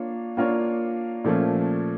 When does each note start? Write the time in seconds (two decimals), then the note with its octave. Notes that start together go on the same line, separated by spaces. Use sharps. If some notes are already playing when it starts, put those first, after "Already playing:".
Already playing: A#3 D4 F4 C#5
0.37 A#3 D4 F4 A#4 C#5
1.24 A#2 F3 A3 C#4